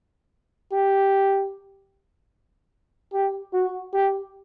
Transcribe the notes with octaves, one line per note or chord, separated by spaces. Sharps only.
G4
G4
F#4
G4